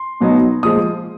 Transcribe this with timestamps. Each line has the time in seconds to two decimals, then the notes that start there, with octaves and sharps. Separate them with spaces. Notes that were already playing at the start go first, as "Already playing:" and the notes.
Already playing: C6
0.21 B2 F#3 B3 D#4
0.63 A#2 F3 G#3 D#6